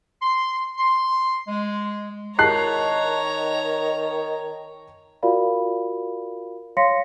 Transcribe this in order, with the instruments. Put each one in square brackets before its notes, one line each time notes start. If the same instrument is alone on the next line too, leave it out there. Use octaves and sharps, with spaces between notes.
[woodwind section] C6
C6
G#3
[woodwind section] D#3 [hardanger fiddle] C#5 A#5 [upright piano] A5 F#6 C7
[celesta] F4 F#4 A#4 D5 F5 B5
C#5 F5 C6 A#6 B6 C#7